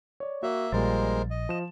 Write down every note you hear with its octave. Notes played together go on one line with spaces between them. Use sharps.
C#5 D5
A#3 F#4 E5
A#1 A#2 G3 G#3 A#4 C5 A6
D#5
F3 E7